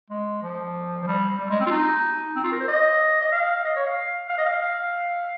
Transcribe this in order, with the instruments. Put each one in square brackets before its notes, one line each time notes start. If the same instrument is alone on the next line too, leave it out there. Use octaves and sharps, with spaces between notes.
[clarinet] G#3
F3
F3
G3
G3
G#3
C4
F4
D#4
C4
F4
A#4
C5
D#5
D#5
F5
D#5
C#5
F5
F5
D#5
F5
F5